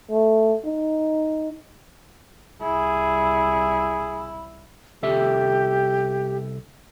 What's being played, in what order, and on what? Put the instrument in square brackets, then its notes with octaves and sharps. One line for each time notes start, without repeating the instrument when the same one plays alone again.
[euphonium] A3
D#4
[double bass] C2 E4 [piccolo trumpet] G#4
[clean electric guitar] C2 A4 E5 [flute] G4